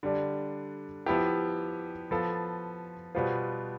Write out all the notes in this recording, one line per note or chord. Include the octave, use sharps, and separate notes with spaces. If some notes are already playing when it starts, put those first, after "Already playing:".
D3 G3 D4
F3 B3 E4 G4
F3 B3 F4 A4
B2 G3 B3 F4 C5